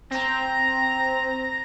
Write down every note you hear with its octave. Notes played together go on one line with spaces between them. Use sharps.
C4 A#5 A#6